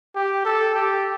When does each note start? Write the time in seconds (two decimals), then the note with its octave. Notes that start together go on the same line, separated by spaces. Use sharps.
0.15 G4
0.45 A4
0.74 G4